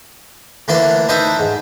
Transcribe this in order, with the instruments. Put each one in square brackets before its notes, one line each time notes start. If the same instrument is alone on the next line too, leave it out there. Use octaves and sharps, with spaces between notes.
[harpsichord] D2 E3 A#3 D4 D5 C6
D4 D#4 B4 C5 E5 G5
G#2